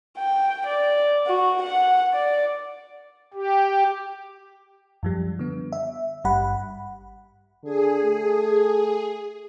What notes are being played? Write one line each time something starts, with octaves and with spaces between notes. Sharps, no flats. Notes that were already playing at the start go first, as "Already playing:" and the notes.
G5
D5
F#4
F#5
D5
G4
F#2 F3 G3
D3 B3
E5
G#1 G2 G3 F#5 B5
D3 G#4
A3